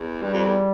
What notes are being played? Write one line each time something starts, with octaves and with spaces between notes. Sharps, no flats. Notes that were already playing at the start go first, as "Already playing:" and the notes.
Already playing: E2
G2 G3
F2
E2